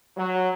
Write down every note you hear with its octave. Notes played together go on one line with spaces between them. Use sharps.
F#3